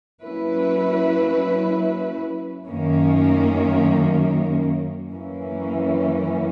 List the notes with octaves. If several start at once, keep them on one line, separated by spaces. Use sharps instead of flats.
F#3 A#3 C#4 E4 B4
F#2 D#3 A#3 C#4
F#2 E3 A#3 C#4